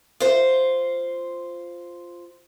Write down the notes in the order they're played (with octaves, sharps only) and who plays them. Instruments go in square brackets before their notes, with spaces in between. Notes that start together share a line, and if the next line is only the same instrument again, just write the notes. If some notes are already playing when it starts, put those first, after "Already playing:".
[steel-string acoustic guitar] F4 C5